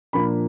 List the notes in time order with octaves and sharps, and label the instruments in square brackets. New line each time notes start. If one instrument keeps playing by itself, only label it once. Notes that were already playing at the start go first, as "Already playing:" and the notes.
[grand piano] A#2 F3 A#3 D4 F4 B5